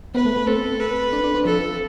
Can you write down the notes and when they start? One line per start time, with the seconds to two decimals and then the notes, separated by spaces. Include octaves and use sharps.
0.14 B3 B4
0.25 A3
0.36 A3
0.47 C4 A4
0.80 B4
1.13 D4
1.24 D4
1.34 C4
1.45 F3 A4